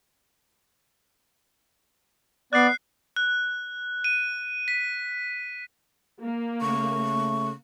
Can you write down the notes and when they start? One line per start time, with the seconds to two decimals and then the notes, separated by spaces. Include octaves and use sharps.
2.53 B3 D5 F#6 C7
3.16 F#6
4.04 D#7
4.68 B6
6.21 A#3
6.61 C#3 A3 C#6